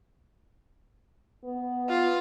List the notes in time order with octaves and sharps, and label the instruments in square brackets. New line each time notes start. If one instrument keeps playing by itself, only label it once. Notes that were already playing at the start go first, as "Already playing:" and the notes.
[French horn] B3
[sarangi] F4